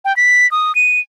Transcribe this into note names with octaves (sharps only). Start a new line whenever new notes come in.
G5
B6
D#6
D#7